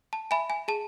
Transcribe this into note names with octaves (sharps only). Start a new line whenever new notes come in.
A5
E5 G#5 B5
G#5
G#4 A5